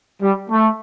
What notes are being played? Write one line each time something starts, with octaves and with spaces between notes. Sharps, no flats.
G3
A3